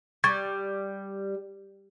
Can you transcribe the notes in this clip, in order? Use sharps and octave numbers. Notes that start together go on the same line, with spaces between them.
G3 C#6 G#6 A6